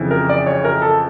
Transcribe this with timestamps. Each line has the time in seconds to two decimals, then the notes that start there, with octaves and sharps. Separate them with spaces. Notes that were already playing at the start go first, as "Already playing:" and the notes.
Already playing: F2 C#3 E3
0.11 A#4
0.29 D5
0.46 C#5
0.65 A#4
0.82 A4